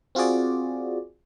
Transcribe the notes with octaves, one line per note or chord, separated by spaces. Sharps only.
C4 F4 F#4 G#4 D5